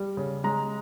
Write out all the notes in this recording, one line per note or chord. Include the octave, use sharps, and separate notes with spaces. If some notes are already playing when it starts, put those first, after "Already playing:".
Already playing: G3
C#3
G#3 A#5